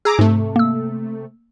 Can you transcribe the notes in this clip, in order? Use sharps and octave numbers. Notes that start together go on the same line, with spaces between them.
G#4 A#5 D6 E6
G#2 C3 A3
A#3 E6